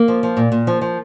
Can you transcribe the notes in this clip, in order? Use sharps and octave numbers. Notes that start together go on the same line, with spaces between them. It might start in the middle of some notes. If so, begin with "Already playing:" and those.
Already playing: A#3
F3
F3
A#2
A#2
F3
F3